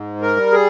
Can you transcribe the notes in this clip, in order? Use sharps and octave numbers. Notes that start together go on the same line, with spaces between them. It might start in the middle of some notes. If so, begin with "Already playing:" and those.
Already playing: G#2
A#4
G3
G#4